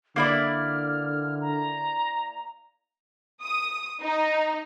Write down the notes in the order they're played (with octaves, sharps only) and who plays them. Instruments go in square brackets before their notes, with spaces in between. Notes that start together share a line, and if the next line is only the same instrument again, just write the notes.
[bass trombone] D3 [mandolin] A#3 E4 D5 [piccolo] F6
[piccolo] A#5
[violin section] D#6
D#4